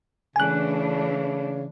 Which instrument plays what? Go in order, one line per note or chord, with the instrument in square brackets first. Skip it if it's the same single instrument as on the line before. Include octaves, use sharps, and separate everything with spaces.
[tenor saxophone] C#3 [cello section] E3 A3 D4 [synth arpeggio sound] G#5 F#6